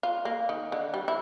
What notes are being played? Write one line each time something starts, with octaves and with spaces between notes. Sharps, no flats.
F4
A#3
D#3
D3
G3
E4